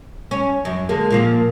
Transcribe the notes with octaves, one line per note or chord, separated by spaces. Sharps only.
C#4
F#2
D3 G#3 A#3
A#2 F3 A#3